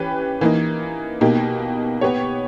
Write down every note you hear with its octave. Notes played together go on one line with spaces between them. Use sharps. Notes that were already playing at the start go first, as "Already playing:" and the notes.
Already playing: E3 C#4 G4 B4
E3 A#3 D#4
B2 A#3 D#4 G4
B3 G4 C#5